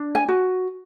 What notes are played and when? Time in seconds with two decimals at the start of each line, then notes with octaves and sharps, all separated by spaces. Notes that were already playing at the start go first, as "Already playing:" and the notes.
Already playing: D4
0.15 G#5
0.28 F#4